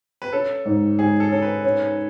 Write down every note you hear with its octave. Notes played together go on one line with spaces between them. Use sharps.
B4
C#4 A4
G#2
G#2 G#4
A4
C#4 A4
B4
C#4